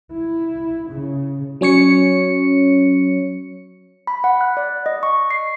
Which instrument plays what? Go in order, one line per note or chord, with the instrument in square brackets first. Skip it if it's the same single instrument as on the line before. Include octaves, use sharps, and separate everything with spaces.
[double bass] E4
C#3
[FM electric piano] F#3 C#4 C#5 C#7
[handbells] B5
F#5
F#6
D5
D#5
C#6
C7